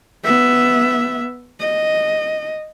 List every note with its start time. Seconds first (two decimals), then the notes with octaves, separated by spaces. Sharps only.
0.24 B3 E5
1.60 D#5